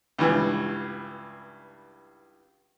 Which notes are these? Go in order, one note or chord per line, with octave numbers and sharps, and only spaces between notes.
C#2 G2 E3